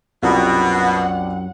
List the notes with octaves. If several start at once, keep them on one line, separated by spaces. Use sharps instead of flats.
C2 F#2 B2 F#3 F4 G4 F#5